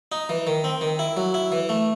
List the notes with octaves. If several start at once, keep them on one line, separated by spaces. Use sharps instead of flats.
D#4
E3
D#3
C4
D#3
E4
F#3
E4
E3
A3